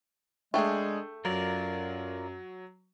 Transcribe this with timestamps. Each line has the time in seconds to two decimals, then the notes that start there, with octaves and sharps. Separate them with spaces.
0.54 G#3 A3 D4 G#4 G5
1.25 F#2 F#3 F4 A#4 D5